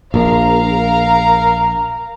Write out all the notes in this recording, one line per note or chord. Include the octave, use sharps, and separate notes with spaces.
A#1 A#4 F5 A#5